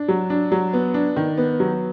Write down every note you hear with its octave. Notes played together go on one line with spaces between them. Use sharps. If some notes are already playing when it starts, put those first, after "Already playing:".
Already playing: D4
F#3
D4
F#3
B3
D4
D#3
B3
F#3